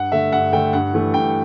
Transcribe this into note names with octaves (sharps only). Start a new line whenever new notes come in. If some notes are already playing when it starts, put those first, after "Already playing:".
Already playing: G2 F#5
D3 A3 E5
G2 F#5
D3 A3 G5
G2 F#5
E3 A3
G2 G5